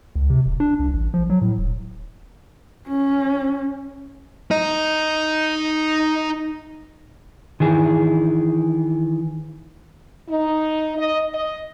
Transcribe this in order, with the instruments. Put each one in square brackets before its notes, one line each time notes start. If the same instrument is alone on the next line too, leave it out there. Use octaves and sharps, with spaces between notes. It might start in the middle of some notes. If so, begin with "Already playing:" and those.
[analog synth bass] C#2
C3
D#1
D4
C2
A1
F3
F#3
A2
D#1
[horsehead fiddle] C#4
[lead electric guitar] D#4 D#5
[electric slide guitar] D#3 E3 G#4
[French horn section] D#4
D#5
D#5